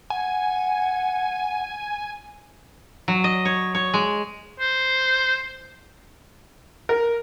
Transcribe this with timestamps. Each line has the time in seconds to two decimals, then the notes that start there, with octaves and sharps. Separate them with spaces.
0.10 F#5 G#5
3.08 F#3
3.24 D#5
3.45 C#5
3.75 C#5
3.94 G#3
4.60 C5
6.89 A#4